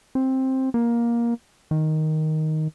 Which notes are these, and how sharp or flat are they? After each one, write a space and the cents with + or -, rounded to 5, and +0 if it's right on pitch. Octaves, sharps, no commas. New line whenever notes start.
C4 +10
A#3 +15
D#3 +5